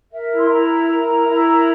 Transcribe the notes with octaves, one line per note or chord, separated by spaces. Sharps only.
A#4 E5
E4
C6
E4 A#5
A#4
A#4
E4
E4
A#4